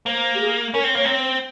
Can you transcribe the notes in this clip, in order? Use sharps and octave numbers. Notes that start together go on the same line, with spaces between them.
A#3 C5
G4
G#4
C#4 A#4
C4
A#3 C#5
C4
C5